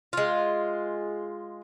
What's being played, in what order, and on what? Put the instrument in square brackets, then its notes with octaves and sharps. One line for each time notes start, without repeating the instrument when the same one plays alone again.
[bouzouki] G#3 F4